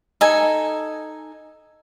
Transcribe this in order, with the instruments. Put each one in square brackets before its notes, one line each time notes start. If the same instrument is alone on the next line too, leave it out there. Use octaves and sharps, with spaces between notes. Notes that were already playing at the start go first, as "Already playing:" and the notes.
[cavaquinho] D#4 A4 G#5